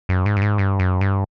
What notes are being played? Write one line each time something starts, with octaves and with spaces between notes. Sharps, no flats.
F#2
G#2
G2
G#2
G2
F#2
G2